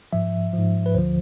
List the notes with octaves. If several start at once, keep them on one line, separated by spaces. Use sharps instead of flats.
G#2 F3 E5
F3
G#2
B4
D2 D3 F3 C5